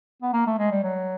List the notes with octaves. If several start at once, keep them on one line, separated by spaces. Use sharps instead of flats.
B3
A#3
A3
G#3
G3
F#3